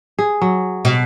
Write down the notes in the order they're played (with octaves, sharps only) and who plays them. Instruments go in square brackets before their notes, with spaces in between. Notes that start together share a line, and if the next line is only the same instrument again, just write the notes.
[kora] G#4
F#3
[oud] B2